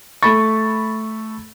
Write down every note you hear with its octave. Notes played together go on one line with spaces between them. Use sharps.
A3 B5 C#6 A6